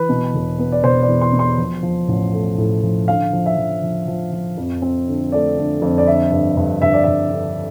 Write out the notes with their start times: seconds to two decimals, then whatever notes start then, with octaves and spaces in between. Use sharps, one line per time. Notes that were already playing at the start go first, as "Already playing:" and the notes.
Already playing: E3 B4
0.09 B2
0.34 E1
0.59 B3
0.72 D5
0.83 E1 C5
1.02 D5
1.08 E2
1.21 C6
1.33 B2
1.39 C6
1.58 F3
1.83 F3
2.08 A1
2.33 A3
2.58 A2
2.83 F3
3.08 D3 F5
3.33 F3
3.46 E5
3.57 F3
3.83 F3
4.08 F3
4.32 F3
4.57 F2
4.82 C4
5.08 D3
5.32 A3 D5
5.58 D3
5.82 F2
5.98 D5
6.07 D3 E5
6.32 G2
6.57 G2
6.82 G2 E5
6.93 D5
7.04 G2 E5
7.32 D3